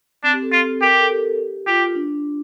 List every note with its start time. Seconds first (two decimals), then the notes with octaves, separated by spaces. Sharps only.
0.23 C4 D4
0.33 G4
0.42 A4
0.52 F4
0.81 G4 A#4
0.91 A#4
1.00 A4
1.10 G4
1.66 F4 G4
1.95 D4